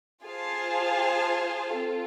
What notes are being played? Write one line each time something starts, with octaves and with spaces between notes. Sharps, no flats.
F4 G#4 C5 F5 A5
C4 F4 A4